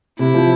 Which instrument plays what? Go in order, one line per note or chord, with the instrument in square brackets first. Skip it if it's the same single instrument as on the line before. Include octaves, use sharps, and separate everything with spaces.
[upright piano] C3 [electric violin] E4
[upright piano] F3